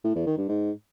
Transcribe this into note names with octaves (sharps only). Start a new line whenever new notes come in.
A2
E2
D#3
G2
G#2